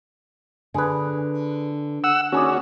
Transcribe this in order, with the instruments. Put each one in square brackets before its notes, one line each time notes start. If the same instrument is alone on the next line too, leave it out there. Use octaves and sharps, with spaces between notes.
[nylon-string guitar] D3 [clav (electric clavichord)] G#4 B4
[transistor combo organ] F#5 E6
[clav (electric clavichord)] D#2 G#4 D5 [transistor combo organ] C#4 F#4